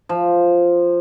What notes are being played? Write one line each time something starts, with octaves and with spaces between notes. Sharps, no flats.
F3